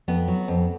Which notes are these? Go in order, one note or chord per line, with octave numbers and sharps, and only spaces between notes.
F2 B3
F#3
F2